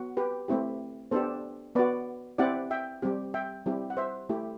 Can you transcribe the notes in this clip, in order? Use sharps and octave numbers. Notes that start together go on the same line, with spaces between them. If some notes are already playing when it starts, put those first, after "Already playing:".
Already playing: B3 F#4
G4 B4
A3 C4 E4 G4
B3 D4 G4 A4 C5
B3 F#4 B4 D5
C4 E4 G4 D5 F#5
E5 G5
G3 C4 G4
E5 G5
G3 C4 E4 G4
F#5
C5 E5
A3 E4 G4